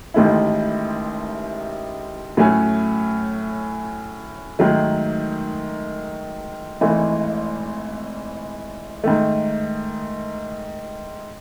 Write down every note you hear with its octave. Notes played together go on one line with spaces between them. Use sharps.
A1 G#2 D#3 A3 E4
A2 F#3 A3 C#4
G#2 D#3 F#3 A3
G#1 G#2 E3 A3
G#2 D#3 A3